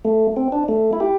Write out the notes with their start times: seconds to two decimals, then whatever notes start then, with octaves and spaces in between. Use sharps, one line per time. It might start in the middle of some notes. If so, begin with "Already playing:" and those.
0.05 A3
0.36 C4
0.52 D4
0.68 A3
0.93 E4
1.00 G4